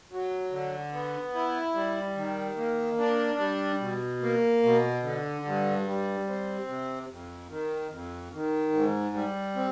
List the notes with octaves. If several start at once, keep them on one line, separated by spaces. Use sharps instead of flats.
F#3
D3
B3
E4
G3
D#3
A#3
D4
G3
B2
A#3
B2
D3
G2
G3
C4
C3
F2
D#3
F2
D#3
G#2
G3
C4